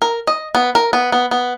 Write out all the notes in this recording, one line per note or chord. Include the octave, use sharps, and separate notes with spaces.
A#4
D#5
B3
A#4
B3
B3
B3